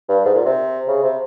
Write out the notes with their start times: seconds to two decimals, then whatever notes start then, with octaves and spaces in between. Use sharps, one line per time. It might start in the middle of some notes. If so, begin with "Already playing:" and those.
0.09 G2
0.25 G#2
0.35 A#2
0.45 C3
0.88 C#3
1.03 C3